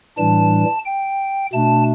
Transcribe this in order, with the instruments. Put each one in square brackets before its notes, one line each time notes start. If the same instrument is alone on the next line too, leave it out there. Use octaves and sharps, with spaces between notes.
[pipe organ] A2 E3 G3 D4 A5
G5
B2 A3 D4 A5